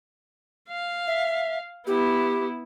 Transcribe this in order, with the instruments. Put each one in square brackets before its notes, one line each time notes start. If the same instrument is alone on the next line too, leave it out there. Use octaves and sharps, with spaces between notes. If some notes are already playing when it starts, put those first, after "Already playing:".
[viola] F5
[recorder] E5
[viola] B3 E4 [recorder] G4